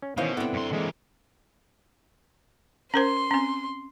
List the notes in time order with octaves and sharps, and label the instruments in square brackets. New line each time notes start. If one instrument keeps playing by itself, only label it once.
[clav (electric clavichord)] C#4
[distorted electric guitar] B2 [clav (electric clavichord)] D#3 E3 C#4 [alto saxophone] C5 [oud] F5
[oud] D3 C4 [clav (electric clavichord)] B3 [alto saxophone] E4
[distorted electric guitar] F#2 C6
[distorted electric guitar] E3 A#3 [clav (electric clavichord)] G#3
[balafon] C#4 A#4 C5 [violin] C6
[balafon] C4 C#4